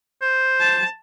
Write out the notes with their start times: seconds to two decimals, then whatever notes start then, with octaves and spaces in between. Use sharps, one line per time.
0.22 C5
0.60 A5